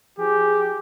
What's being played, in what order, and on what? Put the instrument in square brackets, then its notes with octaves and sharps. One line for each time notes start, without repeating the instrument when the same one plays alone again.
[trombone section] F3 G#4 [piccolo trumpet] G4